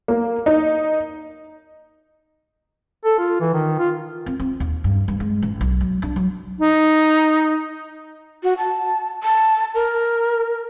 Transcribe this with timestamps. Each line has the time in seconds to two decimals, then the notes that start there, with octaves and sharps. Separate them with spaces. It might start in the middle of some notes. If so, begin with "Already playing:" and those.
0.08 A#3
0.46 D#4
3.05 A4
3.18 F4
3.41 E3
3.54 D#3
3.79 F4
4.26 C4
4.40 C4
4.60 D#2
4.84 G2
5.08 G2
5.20 G#3
5.42 A1
5.61 B1
5.81 F#3
6.02 D4
6.16 F#3
6.59 D#4
8.43 F#4
8.58 A5
9.23 A5
9.75 A#4